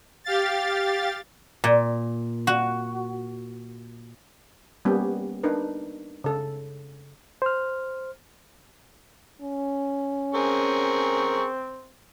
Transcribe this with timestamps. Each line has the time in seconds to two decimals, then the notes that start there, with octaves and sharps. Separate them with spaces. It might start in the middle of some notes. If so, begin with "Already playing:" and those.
0.24 G4 F5 A6
1.64 A#2
2.47 F#4
4.85 G3 A#3 B3 C#4 G4
5.43 D4 D#4 A#4 B4
6.24 C#3 A4
7.42 C5 F6
9.42 C#4
10.35 C4 G#4 A#4 C#6